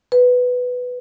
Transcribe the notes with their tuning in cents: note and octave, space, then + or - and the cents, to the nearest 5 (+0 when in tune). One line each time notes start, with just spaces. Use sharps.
B4 +5